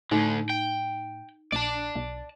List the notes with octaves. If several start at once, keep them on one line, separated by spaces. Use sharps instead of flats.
D2 A2 D3 D#4
G5
A#1 D5 A5
B1